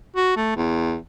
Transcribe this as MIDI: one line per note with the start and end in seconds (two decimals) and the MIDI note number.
0.16 0.32 66
0.37 0.54 57
0.56 0.96 40